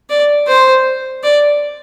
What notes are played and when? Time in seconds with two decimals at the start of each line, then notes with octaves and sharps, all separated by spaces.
0.10 D5
0.47 C5
1.23 D5